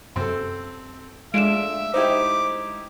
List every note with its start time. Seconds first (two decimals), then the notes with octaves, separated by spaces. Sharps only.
0.16 F#2 C3 C4 A4
1.34 G#3 A3 D4 F4 E5 D7 E7
1.94 D#4 E4 G4 C5 D6